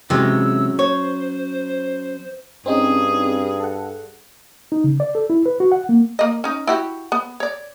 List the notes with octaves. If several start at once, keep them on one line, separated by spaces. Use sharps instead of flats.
C3 E3 F#3 G#3 C#4 E6
C5 C#5
G2 C4 C#4 D#4 G#4
A4 F#5
D#4
C#3
D5
A4
E4
B4
F#4
F#5
A#3
A#3 D#5
C#4 D#4
E4 F#4 G4
B3
C#5 D5